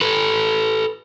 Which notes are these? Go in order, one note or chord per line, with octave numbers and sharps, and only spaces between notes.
A4 B4